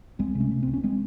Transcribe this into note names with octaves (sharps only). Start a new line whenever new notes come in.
C#2 G#3 C4
C3
A3 C#4
C3
C#2 C4
C#4
G#3 C4